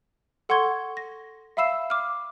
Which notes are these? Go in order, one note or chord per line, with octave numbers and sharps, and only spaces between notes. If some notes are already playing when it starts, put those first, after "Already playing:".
A4 F#5 C6 C#6 G#6 G7
A#6
E5 F5 B5 E6 C7 E7
D6 F6